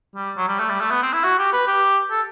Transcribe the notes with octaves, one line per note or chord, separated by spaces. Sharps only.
G3
F#3
G3
A3
G3
A3
B3
C4
E4
F#4
G4
B4
G4
A4